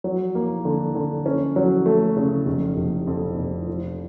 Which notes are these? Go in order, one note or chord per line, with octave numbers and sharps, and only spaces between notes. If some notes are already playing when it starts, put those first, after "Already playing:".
F#3
A#3
D3
D3
C#4
F#3
A3
C#3
F1
F1
F2
F1
F3